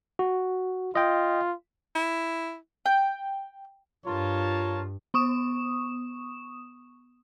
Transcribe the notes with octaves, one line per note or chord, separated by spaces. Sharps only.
F#4
F4 D#5 G5
E4
G5
G2 F4 A#4 C#5 A5
B3 C#6 D#6 E7